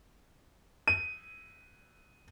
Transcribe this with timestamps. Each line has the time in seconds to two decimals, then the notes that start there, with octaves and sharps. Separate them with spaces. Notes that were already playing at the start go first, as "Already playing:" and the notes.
0.88 D#7